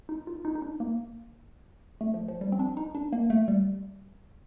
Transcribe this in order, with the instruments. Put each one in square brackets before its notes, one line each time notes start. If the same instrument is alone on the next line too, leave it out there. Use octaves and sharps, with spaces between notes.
[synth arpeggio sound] D#4
F4
D#4
D#4
D4
A#3
A3
F3
F3
G3
C4
D4
D#4
D4
A#3
A3
G3